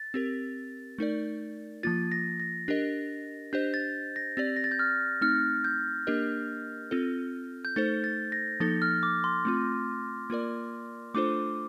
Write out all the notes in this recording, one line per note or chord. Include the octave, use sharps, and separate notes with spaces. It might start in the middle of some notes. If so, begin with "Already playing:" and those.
Already playing: A6
C4 G4 A#4
A3 D#4 A#4 D5
F3 A#3 F4 A6
A#6
A#6
D4 G4 A#4 D#5
D4 G4 C5 D#5 G6
A6
A#6
C4 G4 D5 A6
A#6
A6
G6
F6
A3 C4 D#4 F6
G6
A#3 D4 G4 A#4 D#5
C4 F4 A4
G6
A3 D#4 A4 C5 A6
A6
A#6
F3 A#3 D#4 A4 A6
F6
D6
C6
A3 C4 F4
A#3 F4 A#4 D5
A3 D4 F4 A4 C5 D6